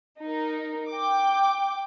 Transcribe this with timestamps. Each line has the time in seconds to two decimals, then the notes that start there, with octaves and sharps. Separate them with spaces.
0.21 D#4 A#4
0.89 G5 D6